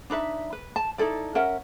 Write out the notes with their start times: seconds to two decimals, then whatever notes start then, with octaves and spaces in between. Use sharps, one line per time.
0.10 D4 D#4 B4 E5
0.53 B4
0.76 A5
0.98 D#4 E4 A4 D5
1.35 C#4 A#4 E5 F#5